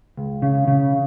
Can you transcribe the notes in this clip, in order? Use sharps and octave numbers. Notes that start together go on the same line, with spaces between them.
C#2
C#3
C#3